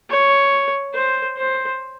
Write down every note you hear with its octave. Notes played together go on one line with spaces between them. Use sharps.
C#5
C5
C5